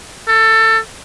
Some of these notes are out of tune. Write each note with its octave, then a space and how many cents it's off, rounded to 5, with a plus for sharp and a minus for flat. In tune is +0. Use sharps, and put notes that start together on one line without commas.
A4 +20